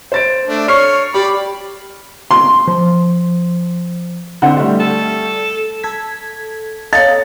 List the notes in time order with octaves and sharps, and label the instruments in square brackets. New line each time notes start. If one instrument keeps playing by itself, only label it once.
[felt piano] C5 A6 D7
[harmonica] A3 D4
[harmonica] C#5 F6 [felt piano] C#6 C7 C#7
[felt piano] G4 [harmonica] D5 B5
[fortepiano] C6
[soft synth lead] F3
[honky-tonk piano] D3 C4 F#5
G3 A3
[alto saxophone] A4
[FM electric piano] A4 G#6 B6
[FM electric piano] A4 D#5 A#5 [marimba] C#5 F5 [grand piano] A6